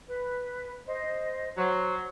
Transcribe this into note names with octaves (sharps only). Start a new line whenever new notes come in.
B4
C5 D#5
F#3 C5